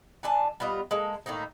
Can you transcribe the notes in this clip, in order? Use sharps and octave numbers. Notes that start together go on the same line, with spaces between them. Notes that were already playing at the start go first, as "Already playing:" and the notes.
E3 D4 G#5 A5
G3 B3 F4 D#5
G#3 A#3 A4
A2 D#3 A#3 D#4